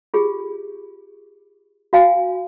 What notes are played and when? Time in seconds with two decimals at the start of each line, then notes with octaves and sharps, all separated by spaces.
0.14 F4 G4 G#4
1.93 F#4 F5 G#5